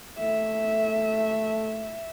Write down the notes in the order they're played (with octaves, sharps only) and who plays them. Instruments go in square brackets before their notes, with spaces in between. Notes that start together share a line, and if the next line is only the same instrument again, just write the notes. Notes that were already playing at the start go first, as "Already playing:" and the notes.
[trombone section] A3 [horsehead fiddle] E5